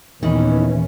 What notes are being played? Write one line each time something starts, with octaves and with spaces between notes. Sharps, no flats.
D#2 A#2 D#3 E3 B3 C#4 D#4 D#5